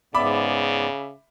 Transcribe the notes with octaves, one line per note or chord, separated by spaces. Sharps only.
G#2 C#3 B3 D5 E5 B5 D6